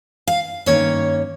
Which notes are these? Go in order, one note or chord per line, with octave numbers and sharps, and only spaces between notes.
F5
G2 D#3 A#3 C#4 C#5